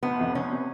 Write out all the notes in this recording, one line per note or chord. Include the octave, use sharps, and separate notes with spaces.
F1 B3
F2 C3
F1 C#4
C3